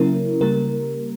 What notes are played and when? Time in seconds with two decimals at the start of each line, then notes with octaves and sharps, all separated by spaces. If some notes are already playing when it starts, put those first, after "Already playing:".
Already playing: C#3 F#3 A#3 C#4 E4 A#4
0.41 C#3 G3 A#3 A#4